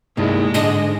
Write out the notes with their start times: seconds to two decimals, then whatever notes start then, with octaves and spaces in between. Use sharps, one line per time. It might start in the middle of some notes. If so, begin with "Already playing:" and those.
0.17 C2 G2 G#3 A#3 D#4 E4
0.54 G#2 D3 D4 G#4 D#5